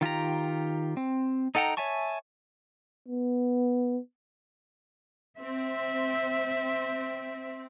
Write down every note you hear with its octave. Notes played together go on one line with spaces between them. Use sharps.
D#3 F4 G4 A#5
C4
D#4 A4 F#5 G5 A#5
C#5 E5 G#5 A5 C#6
B3
C4 E5